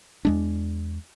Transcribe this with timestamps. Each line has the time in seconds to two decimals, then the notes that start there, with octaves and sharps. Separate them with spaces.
0.25 E2 G#3 D4